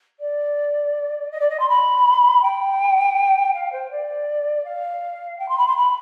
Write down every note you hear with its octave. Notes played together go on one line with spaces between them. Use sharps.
D5
D#5
D5
D#5
C6
B5
G5
F5
C5
D5
F5
G5
C6
B5
C6
B5